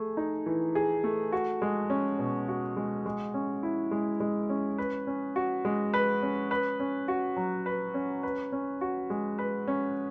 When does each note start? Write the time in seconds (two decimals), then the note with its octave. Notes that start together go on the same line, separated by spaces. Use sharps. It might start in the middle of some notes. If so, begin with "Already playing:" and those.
Already playing: A3 G#4
0.17 D#4
0.46 E3
0.75 G#4
1.04 A3
1.32 F#4
1.62 G#3
1.90 C#4
2.19 B2
2.48 F#4
2.76 G#3
3.06 G#3
3.34 C#4
3.63 E4
3.91 G#3
4.20 G#3
4.49 C#4
4.78 B4
5.07 C#4
5.36 F#4
5.65 G#3
5.94 B4
6.22 C#4
6.51 B4
6.80 C#4
7.08 F#4
7.36 F#3
7.66 B4
7.94 C#4
8.23 B4
8.52 C#4
8.81 F#4
9.10 G#3
9.38 B4
9.68 C#4